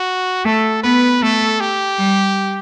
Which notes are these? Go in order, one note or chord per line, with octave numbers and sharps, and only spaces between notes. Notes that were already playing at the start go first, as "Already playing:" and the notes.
Already playing: F#4
A3 A4
B3 B4
A3 A4
G4
G3